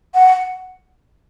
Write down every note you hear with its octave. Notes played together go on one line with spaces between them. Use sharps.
F#5